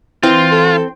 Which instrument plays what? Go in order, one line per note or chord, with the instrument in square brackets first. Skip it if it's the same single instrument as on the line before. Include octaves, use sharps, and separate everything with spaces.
[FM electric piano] E3 [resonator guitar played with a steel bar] C4 [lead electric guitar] F4
[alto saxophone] A4